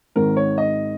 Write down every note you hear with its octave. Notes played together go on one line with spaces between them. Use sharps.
G#1 G#2 D#3 A#4
C#5
D#5